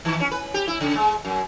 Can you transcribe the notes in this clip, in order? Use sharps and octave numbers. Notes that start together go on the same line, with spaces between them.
D#3
C#4
B4
G4
E4
C#3
G#3
F#2